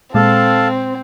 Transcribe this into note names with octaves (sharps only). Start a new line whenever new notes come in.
A#2 G#3 C4 A4 F5 A5